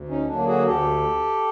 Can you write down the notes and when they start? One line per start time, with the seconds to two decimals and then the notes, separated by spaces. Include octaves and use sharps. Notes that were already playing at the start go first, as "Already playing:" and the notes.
Already playing: D2
0.09 C#4 D#4
0.27 D3 F#3 A#3 D4
0.46 F#4 G#4
0.65 D2 G4 A4